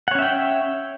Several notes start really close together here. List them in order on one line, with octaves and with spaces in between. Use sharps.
F#5 C#5 C#4 E5 G5